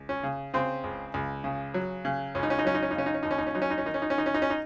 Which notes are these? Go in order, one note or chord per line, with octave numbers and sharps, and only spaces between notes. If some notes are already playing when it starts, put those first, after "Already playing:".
Already playing: C#2
C#4
C#3
C#3 C4
C#2
C#2
C#3
F#3
C#3
C#2 C#4
D#4
C#4
D#4
F#3 C#4
D#4
C#4
D#4
C#3 C#4
D#4
C#4
D#2 D#4
C#4
D#4
C#4
F#3 D#4
C#4
D#4
C#4
D#3 D#4
C#4
D#4
C#4
D#3 D#4
C#4
D#4
C#4
D#4